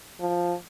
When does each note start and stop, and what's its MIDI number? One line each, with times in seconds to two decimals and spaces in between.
0.20 0.54 53